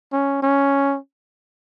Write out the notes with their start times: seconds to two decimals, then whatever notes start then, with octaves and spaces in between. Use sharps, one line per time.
0.12 C#4
0.42 C#4